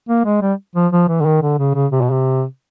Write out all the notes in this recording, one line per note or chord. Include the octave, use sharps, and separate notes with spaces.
A#3
G#3
G3
F3
F3
E3
D3
D#3
D3
C#3
C#3
C3
B2
C3